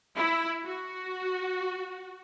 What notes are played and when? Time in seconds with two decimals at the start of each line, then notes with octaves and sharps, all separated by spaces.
0.17 E4
0.64 F#4